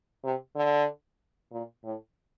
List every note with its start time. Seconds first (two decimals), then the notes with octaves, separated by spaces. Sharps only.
0.24 C3
0.55 D3
1.51 A#2
1.84 A2